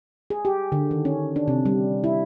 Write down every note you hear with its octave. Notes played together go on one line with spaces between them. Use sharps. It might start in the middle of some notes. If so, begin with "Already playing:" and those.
G#4
G4
D3
D#3
C#4
D4
C3
G3
E4